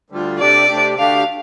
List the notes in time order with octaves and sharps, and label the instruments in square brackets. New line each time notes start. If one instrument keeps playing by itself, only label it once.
[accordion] D2 D3 G3 F4
[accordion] C3 A3 D4 G4 [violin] D5
[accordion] C3 A3 D4 G4
[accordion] D2 D3 A3 D4 G4 [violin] F5